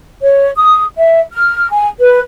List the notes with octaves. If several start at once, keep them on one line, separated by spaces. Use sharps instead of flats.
C#5
D#6
E5
F6
G#5
B4